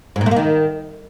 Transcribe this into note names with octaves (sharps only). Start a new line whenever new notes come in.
G#2
A#2
A3
A#3
D#3